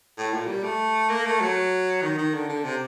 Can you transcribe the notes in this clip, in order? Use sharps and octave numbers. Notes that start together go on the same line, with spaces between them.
A2
A#2
G3
A3
A#3
A3
F#3
D#3
D#3
D3
D3
C3